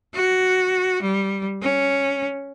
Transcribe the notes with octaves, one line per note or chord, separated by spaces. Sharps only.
F#4
G3
C#4